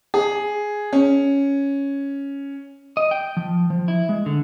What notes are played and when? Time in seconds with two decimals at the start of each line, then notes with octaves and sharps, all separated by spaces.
0.14 G#4
0.93 C#4
2.97 D#5
3.11 G5
3.37 F3
3.70 F3
3.88 E4
4.09 G#3
4.26 D3